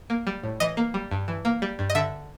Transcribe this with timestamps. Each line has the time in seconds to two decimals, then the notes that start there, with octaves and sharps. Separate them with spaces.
0.10 A#3
0.27 G3
0.43 A2
0.60 E3 D#5
0.77 A#3
0.94 G3
1.11 G2
1.28 E3
1.45 A#3
1.62 G3
1.79 G2
1.90 D#5
1.95 D3 E5